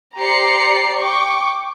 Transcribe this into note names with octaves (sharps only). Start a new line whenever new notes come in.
G4 C5 D5 A#5 C7 C#7
G5 C#6 D6